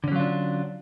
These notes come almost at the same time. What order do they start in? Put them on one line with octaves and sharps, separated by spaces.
D3 C#4 F#3 F4 D4